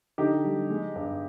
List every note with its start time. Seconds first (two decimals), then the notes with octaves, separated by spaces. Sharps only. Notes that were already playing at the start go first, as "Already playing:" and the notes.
0.18 D3 D#4 G4
0.44 G3
0.70 G#3
0.96 G2